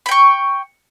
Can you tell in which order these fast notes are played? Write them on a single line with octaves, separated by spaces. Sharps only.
B5 G5 C#6